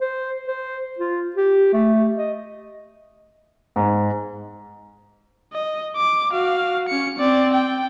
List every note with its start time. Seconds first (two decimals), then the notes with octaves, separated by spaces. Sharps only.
0.01 C5
0.47 C5
0.99 F4
1.36 G4
1.73 A3
2.17 D#5
3.76 G#2
5.53 D#5
5.96 D6
6.32 F#4 F5
6.89 C#4 C#7
7.19 C4 D5
7.54 G5